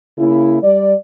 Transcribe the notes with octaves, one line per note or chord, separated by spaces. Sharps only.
C#3 A#3 E4
G3 D5